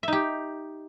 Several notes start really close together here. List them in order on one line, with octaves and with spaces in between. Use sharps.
E5 D#4 G4